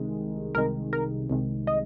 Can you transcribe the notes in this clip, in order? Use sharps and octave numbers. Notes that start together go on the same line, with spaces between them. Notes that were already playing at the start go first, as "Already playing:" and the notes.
Already playing: C2 C3 D#3 G#3
C2 C3 D#3 G#3 A#4
A#4
C2 C3 D#3 G#3
D#5